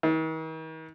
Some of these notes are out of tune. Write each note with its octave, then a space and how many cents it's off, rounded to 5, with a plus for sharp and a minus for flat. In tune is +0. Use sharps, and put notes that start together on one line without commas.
D#3 +45